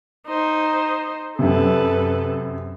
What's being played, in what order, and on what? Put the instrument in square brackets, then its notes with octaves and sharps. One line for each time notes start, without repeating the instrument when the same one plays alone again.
[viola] D#4 C5
[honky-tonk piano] F#2 C3 [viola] A4 B4